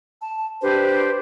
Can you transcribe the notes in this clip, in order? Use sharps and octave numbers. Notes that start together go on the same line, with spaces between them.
A5
D4 G4 B4 C5